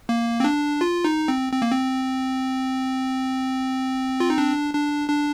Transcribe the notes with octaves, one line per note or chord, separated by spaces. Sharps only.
A#3
C4
D4
F4
D#4
C4
C4
A#3
C4
F4
D#4
D4
D4
D4